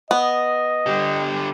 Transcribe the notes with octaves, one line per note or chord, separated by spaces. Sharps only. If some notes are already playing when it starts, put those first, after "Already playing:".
B3 D#5
D3 G4